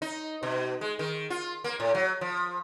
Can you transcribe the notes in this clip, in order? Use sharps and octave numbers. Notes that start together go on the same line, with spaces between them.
D#4
B2
G#3
D#3
F4
A#3
A2
F#3
F3